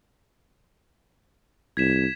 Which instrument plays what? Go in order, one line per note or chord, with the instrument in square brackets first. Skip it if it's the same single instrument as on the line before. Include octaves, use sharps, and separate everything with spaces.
[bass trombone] C2 [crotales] G#6 B6 E7